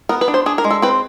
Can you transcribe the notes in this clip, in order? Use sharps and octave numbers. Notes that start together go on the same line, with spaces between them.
B3 A#4
B4
D4
C5
D4 G#4
A#4
G#3
A4
C4 B4